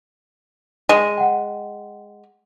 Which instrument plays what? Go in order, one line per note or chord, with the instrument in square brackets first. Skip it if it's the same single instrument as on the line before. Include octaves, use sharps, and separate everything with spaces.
[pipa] G#3 [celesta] D#7
[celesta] F#5 G5